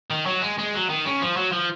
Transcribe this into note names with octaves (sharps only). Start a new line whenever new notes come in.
D#3
F#3
G#3
G#3
F#3
D#3
C#3
F3
F#3
F3